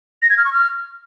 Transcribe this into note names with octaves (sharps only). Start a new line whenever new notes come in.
A#6
G#6
F6
C#6
F6